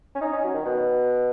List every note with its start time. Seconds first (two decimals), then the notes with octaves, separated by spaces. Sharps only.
0.15 C#4
0.21 D#4
0.33 C#4
0.44 F#3
0.54 D#3
0.65 B2